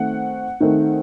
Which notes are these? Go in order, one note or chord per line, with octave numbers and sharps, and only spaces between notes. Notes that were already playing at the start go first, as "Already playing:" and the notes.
Already playing: D#3 A3 C4 F#5
D#3 A3 C4